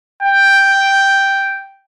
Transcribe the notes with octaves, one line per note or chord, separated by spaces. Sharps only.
G5